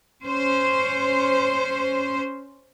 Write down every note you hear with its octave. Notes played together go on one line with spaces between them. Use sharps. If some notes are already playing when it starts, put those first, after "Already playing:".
C#4 C5